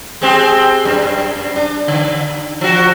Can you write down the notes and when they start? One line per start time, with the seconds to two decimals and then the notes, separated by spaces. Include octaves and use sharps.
0.21 G#3 C4 G4
0.85 F#2
1.56 D4
1.88 D3
2.61 F3 F#4